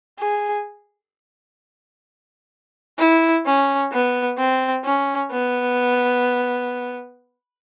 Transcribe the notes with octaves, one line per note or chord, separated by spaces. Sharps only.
G#4
E4
C#4
B3
C4
C#4
B3